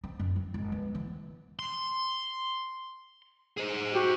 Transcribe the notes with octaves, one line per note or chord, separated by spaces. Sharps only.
C4
F#2
F#3
G#1
B3
E3
C6
G#4 C5
F#4 G4